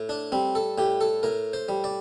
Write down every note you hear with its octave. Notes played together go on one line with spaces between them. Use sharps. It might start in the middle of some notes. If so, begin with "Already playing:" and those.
Already playing: A2
D4
G3 C4
A4
A2 G4
A4
A2 A#4
C5
G3
D5